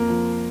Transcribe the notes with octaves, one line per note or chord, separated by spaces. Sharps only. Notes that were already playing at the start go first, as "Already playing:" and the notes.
Already playing: F2 A#3
F3